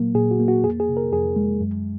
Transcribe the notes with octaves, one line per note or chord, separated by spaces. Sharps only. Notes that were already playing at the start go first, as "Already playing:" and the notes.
Already playing: A#2 F#3 A#3
A#2 G#4
F#4
A#3
F#4
F2 G#4
G#4
C3
A#4
F2 G#4
G#3
F#2